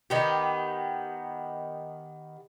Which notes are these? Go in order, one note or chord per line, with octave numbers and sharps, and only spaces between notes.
D#3 B3 G4